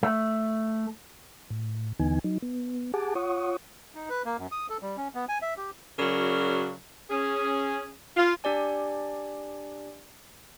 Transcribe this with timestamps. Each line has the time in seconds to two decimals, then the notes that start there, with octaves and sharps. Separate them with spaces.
0.03 A3
1.50 A2
1.99 D#2 D3 E3 B3 D#4 G#5
2.24 F#3 D#4
2.42 B3
2.94 G4 G#4 F#5 G#5 A5 D6
3.15 F4 C#5 F#5 C#6 D#6
3.95 D#4
4.10 B4
4.25 A#3
4.38 F#2
4.52 D#6
4.70 A4
4.82 G3
4.97 C#4
5.15 B3
5.29 G#5
5.42 E5
5.57 G4
5.99 C#3 F#3 F#4 A#4 D5
7.10 C#4 G#4
8.17 F4
8.44 D4 G4 D5 G#5